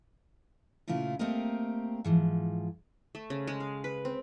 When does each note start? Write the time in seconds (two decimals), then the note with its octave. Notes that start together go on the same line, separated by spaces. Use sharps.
0.88 A#2 C#3 A3 E4 F4
1.19 A3 A#3 C4 G4 A#4 D#5
2.05 G#2 E3 F3
3.15 A3
3.30 C#3
3.47 G#3
3.60 F5
3.84 B4
4.05 C4